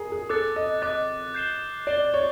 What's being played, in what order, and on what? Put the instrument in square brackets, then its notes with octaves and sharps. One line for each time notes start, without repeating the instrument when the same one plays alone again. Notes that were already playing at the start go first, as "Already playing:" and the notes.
Already playing: [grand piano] G#4 A#4
G#4
[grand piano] A4 [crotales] D6 F#6 A6
[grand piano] D#5
[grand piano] D#5 [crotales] D6 F#6 A6
[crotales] G6 C7 E7 G7
[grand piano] D5 [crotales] G6 C7 E7 G7
[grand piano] C#5